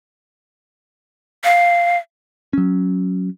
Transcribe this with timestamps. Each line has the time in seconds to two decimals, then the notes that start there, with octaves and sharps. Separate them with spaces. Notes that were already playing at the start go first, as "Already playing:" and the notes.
1.44 F5
2.53 F#3 C#4